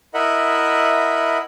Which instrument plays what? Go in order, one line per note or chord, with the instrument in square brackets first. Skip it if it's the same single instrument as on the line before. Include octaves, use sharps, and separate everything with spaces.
[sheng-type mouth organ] E4 A#4 D#5 E5 F#5 B5